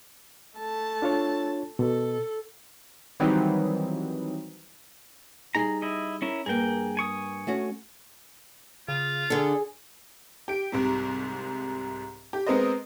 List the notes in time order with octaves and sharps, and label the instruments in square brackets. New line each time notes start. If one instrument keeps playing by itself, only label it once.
[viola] A3 A5
[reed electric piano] D4 F4 C#5
[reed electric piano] B2 [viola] A4
[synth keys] D#3 E3 F#3 G3 C4 D#4
[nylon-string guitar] G3 D#4 G#4 [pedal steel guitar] A#5
[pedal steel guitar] E4 D#5
C#4 E4 A#4
[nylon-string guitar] G2 A#3 [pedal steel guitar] G#4 A#4 G5
[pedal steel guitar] G#5 C#6 D#6
[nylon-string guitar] A3 C#4 F#4
[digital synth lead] C#3 [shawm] F4
[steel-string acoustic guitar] D3 D4 [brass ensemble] G#4 [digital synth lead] A4
[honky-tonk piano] G4 D7
C2 G#2 C3 G3
G4
G#3 B3 C4 A#4 C5 D#5